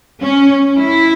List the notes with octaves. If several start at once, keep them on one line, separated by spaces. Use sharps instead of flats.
C#4
E4